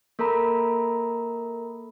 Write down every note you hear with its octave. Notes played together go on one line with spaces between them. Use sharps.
A#3 A4 A#4 A#5 B5